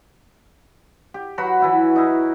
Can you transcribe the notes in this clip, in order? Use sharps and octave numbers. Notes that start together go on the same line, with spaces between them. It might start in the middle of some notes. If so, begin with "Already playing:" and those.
G4
F#3 F#4 B4 B5
E3 E4 F#4
D#4 E4